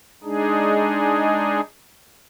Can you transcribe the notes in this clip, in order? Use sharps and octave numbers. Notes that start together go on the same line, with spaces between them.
G#3 D4 D#4 G#4